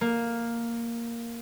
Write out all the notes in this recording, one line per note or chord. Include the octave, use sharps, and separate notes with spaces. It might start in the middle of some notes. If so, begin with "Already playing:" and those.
A#3